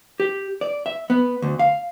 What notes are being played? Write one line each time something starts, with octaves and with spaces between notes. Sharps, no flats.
G4
D5
E5
B3
D2
F5